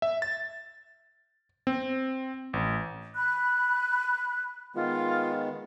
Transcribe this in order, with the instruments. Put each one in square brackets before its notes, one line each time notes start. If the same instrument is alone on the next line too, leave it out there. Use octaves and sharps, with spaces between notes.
[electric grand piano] E5
A6
C4
A1
[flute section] B5 F#6
[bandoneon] D#3 G#3 B3 [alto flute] F4